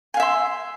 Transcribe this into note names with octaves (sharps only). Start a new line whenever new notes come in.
E5 F5 G#5 C6